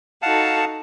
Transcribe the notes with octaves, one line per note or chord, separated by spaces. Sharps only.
D#4 F#4 A4 F5 F#5 A5